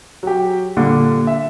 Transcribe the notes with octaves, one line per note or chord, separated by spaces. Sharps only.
F#3 G4
A#2 D3 G3
E5